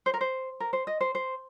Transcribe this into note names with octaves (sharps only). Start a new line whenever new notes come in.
C5
A#4
C5
A#4
C5
D#5
C5
C5